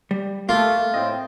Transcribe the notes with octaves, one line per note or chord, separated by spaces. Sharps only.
G3
A3 A#3 F4
A2 C4 D#5